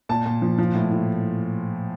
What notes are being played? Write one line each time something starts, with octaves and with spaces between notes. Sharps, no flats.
A#2 A5
A#2
F3
F3
A2
A2